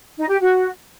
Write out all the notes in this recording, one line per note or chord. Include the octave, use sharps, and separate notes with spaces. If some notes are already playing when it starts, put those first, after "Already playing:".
D#4
G4
F#4